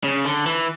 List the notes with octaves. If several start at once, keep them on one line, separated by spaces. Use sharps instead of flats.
C#3
D3
E3